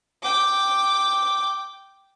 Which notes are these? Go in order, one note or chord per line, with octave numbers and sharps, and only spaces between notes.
G5 D6